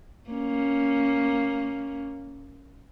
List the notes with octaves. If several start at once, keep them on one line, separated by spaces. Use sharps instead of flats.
A#3 C#4